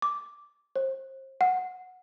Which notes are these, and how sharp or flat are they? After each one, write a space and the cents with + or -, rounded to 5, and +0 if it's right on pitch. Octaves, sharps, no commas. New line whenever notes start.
D6 -5
C5 +35
F#5 -10